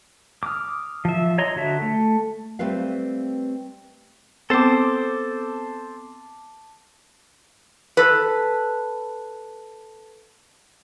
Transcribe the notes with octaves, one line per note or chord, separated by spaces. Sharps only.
D6 D#6 F6
F3 E5
C#5 D#5 A#5 C6
D3 F#4 E5
A3
G3 A3 C4 B4 F5
B3 C4 A4 C5 A5 D6
A4 B4